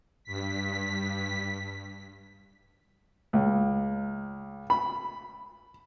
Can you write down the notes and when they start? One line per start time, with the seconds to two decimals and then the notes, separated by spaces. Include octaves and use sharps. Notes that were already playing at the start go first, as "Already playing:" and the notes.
0.24 G2 B6
3.33 C#2
4.70 B5